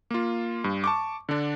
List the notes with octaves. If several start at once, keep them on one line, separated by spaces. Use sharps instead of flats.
A#3 F4
G2
A5 C#6 D6
D3 D4